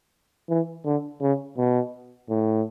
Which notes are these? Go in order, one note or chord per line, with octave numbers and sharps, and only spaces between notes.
E3
D3
C#3
B2
A2